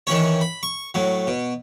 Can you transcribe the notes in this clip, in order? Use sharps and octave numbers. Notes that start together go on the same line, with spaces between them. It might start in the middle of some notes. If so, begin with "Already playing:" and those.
D#3 E3 C#4 C#5
B5
C#6
A2 F#3
B2